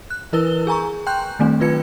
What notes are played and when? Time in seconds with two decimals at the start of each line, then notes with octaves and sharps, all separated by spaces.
0.10 F#6
0.33 E3 E4 A#4 B4 E6 G7
0.67 G#4 G#5 A#5 C#6
1.07 G5 C6 F#6 G6
1.39 D#3 G3 A3 C4 D4
1.60 D#3 F#3 F4 B4 G#6 C#7